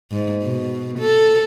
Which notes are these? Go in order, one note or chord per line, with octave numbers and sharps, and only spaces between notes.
G#2
B2
A4